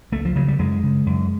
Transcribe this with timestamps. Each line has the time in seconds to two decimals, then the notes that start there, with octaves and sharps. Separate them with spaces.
0.12 C#2 A3
0.25 F3
0.35 C#3 F#3
0.48 G3
0.59 F#2 G#3
0.83 C#3
1.06 F#2